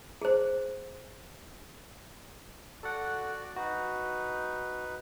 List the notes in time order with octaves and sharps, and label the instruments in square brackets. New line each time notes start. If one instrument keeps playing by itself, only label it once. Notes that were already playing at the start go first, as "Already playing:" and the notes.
[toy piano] G#4 C5
[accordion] F#4 D5 [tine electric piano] A4 F#5
[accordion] D#4 B4 [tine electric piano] F#4